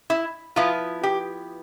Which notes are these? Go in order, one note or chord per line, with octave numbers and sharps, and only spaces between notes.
E4
F3 B3 E4 F4
G4